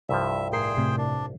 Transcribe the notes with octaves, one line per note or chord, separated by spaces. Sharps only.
C2 G2 F3 E5
A2 G#4 A#4 C5 G5 C7
A2 C3
D4